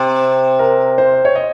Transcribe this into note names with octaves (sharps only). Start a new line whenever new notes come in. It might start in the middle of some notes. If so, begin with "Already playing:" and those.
Already playing: C3
A#4
C5
C#5
D#5